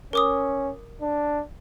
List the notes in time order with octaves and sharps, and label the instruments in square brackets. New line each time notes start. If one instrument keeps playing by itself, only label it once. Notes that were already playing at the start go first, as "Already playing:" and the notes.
[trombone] C#4 [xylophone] A#4 D6 D#6
[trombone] D4